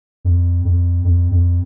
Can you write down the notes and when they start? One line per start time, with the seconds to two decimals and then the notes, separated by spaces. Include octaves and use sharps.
0.25 F2
0.65 F2
1.05 F2
1.31 F2